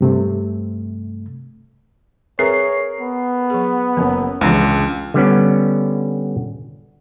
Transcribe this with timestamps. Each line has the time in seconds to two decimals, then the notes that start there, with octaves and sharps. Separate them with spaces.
0.01 G2 C3 A3
2.39 C4 G#4 A#4 B4 C#5 E5 C7
3.01 B3
3.50 F#3 G#4
3.97 F#1 F#2 A#3 A#4
4.41 F1 C#2 E3 D4 F4
5.14 D3 G3 B3 C#4